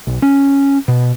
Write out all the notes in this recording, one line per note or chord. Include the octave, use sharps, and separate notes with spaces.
B1
C#4
B2